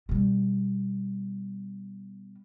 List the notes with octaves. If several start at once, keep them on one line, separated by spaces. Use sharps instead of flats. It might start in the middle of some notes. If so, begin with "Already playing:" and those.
B2 G3